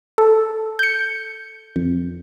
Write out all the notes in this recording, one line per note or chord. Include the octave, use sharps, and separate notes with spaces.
A4
G6 C#7
F2